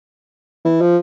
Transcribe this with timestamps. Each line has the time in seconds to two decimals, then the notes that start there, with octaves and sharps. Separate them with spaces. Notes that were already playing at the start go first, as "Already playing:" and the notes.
0.65 E3
0.81 F3